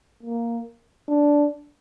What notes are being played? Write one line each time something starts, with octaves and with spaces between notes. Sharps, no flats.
A#3
D4